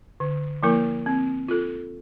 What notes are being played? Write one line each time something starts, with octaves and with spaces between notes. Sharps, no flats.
D3
F3 A#3 E4 A#4
C4
F4 A4